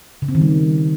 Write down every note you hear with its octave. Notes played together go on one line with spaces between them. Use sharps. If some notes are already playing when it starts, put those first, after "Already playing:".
C#3
C4
D#3
G3